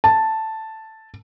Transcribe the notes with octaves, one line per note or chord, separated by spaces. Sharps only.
A5